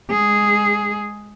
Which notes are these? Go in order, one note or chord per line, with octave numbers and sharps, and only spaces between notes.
G#3 G#4